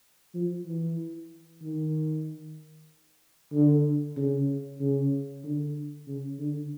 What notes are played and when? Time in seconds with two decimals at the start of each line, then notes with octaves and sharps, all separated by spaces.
0.34 F3
0.67 E3
1.62 D#3
3.53 D3
4.17 C#3
4.80 C#3
5.44 D3
6.07 C#3
6.39 D3